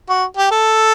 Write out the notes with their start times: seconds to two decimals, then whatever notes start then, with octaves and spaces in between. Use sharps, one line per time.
0.09 F#4
0.37 G4
0.51 A4